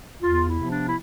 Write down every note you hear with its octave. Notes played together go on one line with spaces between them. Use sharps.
E2 F4
E4
C3 F3 B3
D4
E4